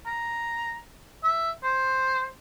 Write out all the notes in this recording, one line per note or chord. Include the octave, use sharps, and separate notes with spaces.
A#5
E5
C5